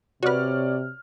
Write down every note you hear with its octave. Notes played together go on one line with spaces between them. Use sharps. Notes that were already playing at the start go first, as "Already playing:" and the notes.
C3 F#4 B4 C#5 D5 F6